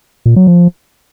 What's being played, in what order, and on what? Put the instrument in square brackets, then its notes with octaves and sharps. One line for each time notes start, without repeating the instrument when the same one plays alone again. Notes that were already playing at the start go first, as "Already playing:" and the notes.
[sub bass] A#2
F#3
F3